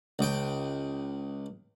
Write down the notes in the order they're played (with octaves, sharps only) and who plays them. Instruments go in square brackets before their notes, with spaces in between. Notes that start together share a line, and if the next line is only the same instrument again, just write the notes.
[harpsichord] C#2 G5